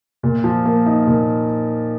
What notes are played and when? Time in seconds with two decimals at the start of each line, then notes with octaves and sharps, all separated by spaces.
0.23 A#2
0.44 F3
0.65 A#3
0.86 D#4
1.07 A#2